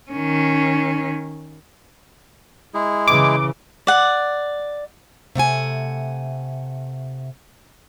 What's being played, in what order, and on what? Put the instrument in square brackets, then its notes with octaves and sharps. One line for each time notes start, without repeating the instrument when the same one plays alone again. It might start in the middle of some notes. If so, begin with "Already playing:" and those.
[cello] D#3 C#4
[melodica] G#3 E4 G#4
[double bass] C#3 E3 [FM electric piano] D6
[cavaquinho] D5 F#5
[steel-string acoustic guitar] C3 A3 F#5 G#5